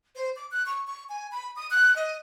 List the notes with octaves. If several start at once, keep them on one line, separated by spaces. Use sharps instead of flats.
C5
D6
F#6
C#6
C#6
G#5
B5
D#6
F#6
D#5